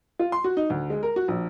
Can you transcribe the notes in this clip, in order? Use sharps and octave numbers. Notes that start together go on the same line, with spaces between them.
F4
C6
F#4
D#4
D2
G#3
A#4
F#4
A#1